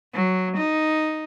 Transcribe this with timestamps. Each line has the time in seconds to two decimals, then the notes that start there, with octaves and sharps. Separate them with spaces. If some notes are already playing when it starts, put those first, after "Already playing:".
0.14 F#3
0.56 D#4